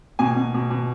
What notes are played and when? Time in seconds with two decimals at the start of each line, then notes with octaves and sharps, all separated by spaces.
0.19 B2 G#5
0.37 B2
0.54 B2
0.71 B2